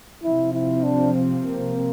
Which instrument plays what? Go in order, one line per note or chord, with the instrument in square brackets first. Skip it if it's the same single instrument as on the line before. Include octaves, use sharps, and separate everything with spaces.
[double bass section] C3 F3 C4 [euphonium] E4
[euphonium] E4
D4
A#3